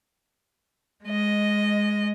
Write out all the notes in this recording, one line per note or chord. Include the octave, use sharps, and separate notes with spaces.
G#3 D#5